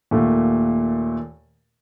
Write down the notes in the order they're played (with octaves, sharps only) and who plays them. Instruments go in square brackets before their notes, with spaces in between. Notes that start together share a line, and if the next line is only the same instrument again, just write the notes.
[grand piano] D#2 A#2 A3